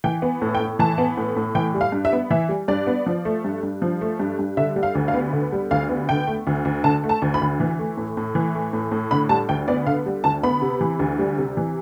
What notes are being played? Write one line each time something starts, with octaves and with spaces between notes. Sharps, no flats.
E3 G5
B3
A2
G5
A2
E3 A5
B3
A2
A2
E3 G5
G3
F5
G2
E5
B3
E3 E5
G3
G2 D5
B3
F3
A3
G2
G2
F3
A3
G2
G2
D3 E5
G3
F5
D2
F5
B3
D3
G3
D2 F5
B3
D3 G5
A3
D2
D2
D3 A5
A3
A5
D2
B5
D2
E3
A3
A2
A2
E3
A3
A2
A2
D3 B5
G3 A5
D2 G5
B3 D5
D3 F5
G3
D2 A5
B3 B5
C3
E3
D2
G3
C3
E3